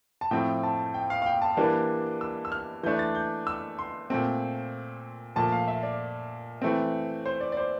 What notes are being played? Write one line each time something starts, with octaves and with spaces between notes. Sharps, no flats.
A5
A2 F3 A3 C4 G5
A5
G5
F5
F5
G5
A5
E3 G3 A#3 D4
E6
E6
F6
E3 A3 D4 G6
A6
G6
E6
C6
A#2 A3 C4
A#2 F3 A3 A5
F5
E5
D5
E3 A3 C4
C5
D5
D5
C5